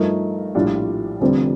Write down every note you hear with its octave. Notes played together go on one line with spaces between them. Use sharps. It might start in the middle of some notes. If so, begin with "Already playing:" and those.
Already playing: G2 F3 A3 D#4 A#4
A#1 A2 G3 D4 F4
F1 F2 D3 G3 C4